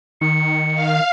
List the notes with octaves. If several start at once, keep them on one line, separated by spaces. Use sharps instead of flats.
D#3 C#7
F5